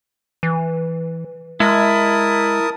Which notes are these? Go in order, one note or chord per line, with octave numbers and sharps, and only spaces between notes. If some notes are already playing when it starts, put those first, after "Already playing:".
E3
G#3 E4 A#4 A5 D#6